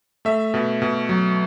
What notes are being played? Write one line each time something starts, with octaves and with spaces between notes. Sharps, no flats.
A3 E5
B2
B2
F#3